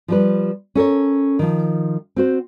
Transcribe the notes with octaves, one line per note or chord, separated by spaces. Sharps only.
F3 G3 B4
C#4 A4 A#4 C#5
D#3 F3
C4 F#4 C5